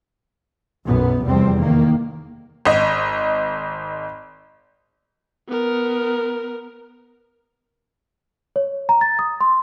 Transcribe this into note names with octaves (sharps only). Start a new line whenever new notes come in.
B1 F#2 B3
F1 E2 G3 C4
D#3 A#3
G#1 D#5
B3 A#4
C#5
A#5
A6
D#6
C6